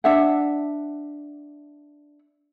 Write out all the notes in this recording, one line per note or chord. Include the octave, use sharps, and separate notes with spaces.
D4 E5 F#5